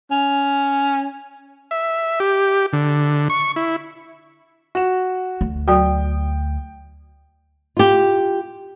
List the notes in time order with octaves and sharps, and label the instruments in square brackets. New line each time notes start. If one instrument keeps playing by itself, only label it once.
[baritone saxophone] C#4
[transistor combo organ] E5
G4
D3
C#6
E4
[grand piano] F#4 E7
[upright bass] D2
[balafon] F#3 F#4 [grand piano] G5
[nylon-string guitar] F4 G4